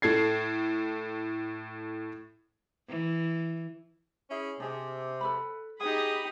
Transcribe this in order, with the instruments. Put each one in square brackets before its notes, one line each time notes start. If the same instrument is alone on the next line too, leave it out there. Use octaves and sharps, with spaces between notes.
[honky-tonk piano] A2 A4 G#6 C7
[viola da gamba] E3
[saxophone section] C#4 E4 G#4
[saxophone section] C3 [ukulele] D4 G#4 D#5
[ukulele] A4 B4 B5
[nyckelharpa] D#4 D#6 [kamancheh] G4 B5 [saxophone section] G#4 [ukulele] G5